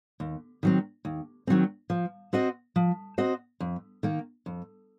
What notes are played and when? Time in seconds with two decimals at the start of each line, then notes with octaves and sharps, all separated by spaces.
0.20 D#2
0.63 D#3 F#3 C4
1.05 D#2
1.47 D#3 F#3 C4
1.90 F3
2.33 C4 F#4 C5 D#5
2.76 F3
3.18 C4 F#4 C5 D#5
3.60 F2
4.03 D#3 A#3
4.46 F2